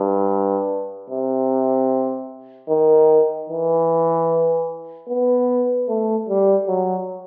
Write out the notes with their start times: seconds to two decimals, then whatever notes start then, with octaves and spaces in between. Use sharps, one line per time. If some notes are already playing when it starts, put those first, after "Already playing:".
Already playing: G2
1.10 C3
2.69 D#3
3.49 E3
5.09 B3
5.88 A3
6.29 G3
6.68 F#3